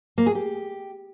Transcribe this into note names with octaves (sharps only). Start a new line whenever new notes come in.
A#3
G#4
G4